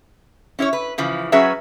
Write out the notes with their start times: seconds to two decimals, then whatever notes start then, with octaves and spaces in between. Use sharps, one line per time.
0.59 C#4 E4 C5 C#5
0.73 B4
0.98 C#3 E3 F3
1.32 F#3 C#4 F#4 G#4 B4 E5